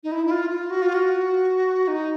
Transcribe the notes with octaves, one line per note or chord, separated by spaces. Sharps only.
D#4
E4
E4
F4
F4
F#4
F4
F#4
D#4